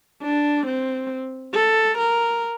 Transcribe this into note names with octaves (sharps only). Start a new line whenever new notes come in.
D4
C4
A4
A#4